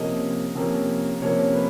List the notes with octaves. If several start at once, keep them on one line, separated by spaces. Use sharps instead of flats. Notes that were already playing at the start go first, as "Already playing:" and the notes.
Already playing: C3 F3 A#3 C#4 D#5
C3 F3 A#3 C#4
C3 F3 A#3 C#4 C#5
B4